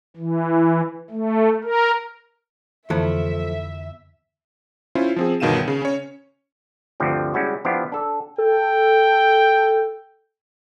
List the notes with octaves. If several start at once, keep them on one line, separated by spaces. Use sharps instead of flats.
E3
A3
A#4
F2 D3 E3 F3 A3 B3 E5
C#4 E4 F4 C5
F3 C4 G#4
G1 B2 D#3 F5 D#7 E7
C#3
C#4 C#5
D2 G2 D3 F3 G3 C4
G3 G#3 C#4 E4 F#4
F3 B3 D4 E4 F4 G4
D4 A4
A4 G5